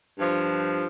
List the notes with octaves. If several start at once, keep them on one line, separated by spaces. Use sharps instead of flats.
G2 F3